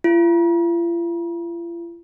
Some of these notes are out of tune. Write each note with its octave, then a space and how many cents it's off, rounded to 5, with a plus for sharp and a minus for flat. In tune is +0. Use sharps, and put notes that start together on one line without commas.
F4 -45